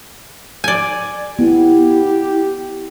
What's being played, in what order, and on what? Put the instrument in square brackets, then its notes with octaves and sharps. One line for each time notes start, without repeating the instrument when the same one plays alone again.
[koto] D5 G#5
[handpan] B3 [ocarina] E4 [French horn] G4